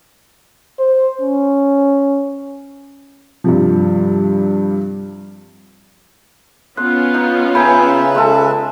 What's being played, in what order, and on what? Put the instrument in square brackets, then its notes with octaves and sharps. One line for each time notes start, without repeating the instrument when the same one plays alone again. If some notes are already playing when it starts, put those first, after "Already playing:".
[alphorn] C5
C#4
[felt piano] G2 C3 F3
[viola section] B3 C#4 F4 [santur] C6 [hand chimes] F#6
[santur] D#4
[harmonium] C#3 B4 E5 [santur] G5 G#5 A#5 [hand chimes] B5
[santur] G#3 A4